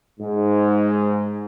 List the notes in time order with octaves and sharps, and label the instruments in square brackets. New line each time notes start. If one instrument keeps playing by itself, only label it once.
[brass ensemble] G#2